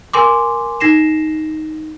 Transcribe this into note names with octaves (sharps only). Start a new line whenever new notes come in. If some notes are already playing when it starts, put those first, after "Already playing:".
A#4 G#5 C6 D6
D#4 A#6 C7 E7